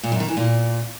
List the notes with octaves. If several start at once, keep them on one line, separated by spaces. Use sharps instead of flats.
A#2
F#2
D#3
E3
A#2